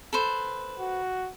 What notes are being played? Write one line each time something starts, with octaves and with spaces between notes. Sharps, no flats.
A4 B4 C5
F#4